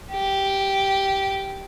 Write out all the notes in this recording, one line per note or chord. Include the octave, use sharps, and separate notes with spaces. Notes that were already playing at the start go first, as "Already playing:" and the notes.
G4